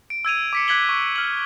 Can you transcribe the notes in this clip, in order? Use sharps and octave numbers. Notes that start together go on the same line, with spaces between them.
D7
E6 G#6 D#7 F7
D6 B6 C#7
D6 F#6 G#6 B6 F#7 G7
C#6
F6 F#7